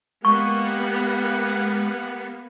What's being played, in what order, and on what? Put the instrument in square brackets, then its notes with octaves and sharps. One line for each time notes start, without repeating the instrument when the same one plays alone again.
[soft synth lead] G#3 [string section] A#3 B3 [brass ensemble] G4 F#5 [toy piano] C#6